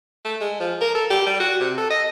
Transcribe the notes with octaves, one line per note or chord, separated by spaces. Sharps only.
A3
G#3
F3
A#4
A4
G4
G3
F#4
C3
A4
D#5